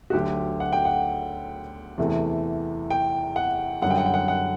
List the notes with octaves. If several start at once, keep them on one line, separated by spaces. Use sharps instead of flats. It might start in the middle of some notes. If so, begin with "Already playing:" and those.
F#4
D2 D3 F#3 G4
F#5
G5
F#5
E2 C3 E3 A3
G5
F#5
F#2 D3 G3 F#5
G5
F#5
G5
F#5
F#5